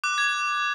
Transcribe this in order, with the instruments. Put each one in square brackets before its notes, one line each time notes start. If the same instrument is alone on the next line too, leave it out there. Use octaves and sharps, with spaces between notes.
[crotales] D6 F#6
G#6